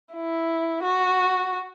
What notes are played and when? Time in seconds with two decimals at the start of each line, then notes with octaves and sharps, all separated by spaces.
0.14 E4
0.83 F#4